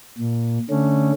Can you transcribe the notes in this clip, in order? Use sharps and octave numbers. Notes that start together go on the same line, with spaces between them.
A#2
D3 A3 C#4